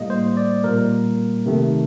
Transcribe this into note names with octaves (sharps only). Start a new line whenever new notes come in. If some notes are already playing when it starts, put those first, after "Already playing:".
Already playing: A2 G3 A#3 D#5
C5
D5
A#2 G3 A#3 A#4
C3 D#3 A3